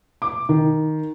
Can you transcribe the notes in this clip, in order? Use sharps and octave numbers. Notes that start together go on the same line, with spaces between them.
D6
D#3